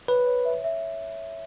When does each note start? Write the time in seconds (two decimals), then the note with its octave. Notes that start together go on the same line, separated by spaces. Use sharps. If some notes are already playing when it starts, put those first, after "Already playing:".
0.08 B4 C#5
0.27 C#5
0.45 E5
0.64 E5